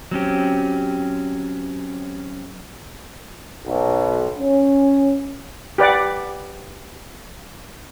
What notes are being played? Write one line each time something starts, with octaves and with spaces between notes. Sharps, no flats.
F#3 C4 C#4 G4
B1
C#4
G4 B4 D5 F#5